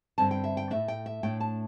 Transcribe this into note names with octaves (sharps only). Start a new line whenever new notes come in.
G2 D3 C4 A5
G5
E5
G5
A2 A3 D4 E5
G5
E5
A2 A3 D4 G5
A5